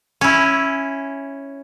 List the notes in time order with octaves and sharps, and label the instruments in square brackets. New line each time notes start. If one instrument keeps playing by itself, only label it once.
[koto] C#4 E4